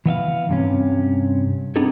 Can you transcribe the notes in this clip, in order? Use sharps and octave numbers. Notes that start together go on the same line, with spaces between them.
E3 B3 E5 F5
G2 C3 C#4
B3 C4 D4 D#4 G#4 A4